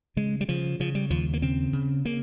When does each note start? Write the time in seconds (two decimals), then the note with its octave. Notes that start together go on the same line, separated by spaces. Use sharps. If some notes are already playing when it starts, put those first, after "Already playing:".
0.16 C#3 G#3
0.41 G3
0.49 C#3 F3
0.80 C#3 F3
0.95 G3
1.10 D#2 F3
1.33 A#3
1.42 C#3 C4
1.73 C#3
2.05 C#3 A#3